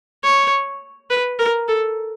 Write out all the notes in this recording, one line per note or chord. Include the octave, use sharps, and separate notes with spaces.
C#5
B4
A#4
A4